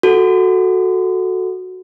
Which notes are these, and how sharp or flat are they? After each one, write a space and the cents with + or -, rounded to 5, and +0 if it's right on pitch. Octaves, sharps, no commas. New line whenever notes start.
F#4 +0 A4 +0